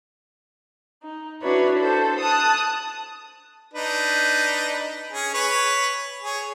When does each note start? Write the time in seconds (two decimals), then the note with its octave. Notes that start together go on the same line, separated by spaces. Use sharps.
1.02 D#4
1.42 D4 E4 F#4 B4 C#5
1.79 A4 C5
2.19 A5 D#6 F#6
3.74 D4 D#4 B4
5.12 C#4 G#4
5.34 B4 C#5
6.22 G#4 C#5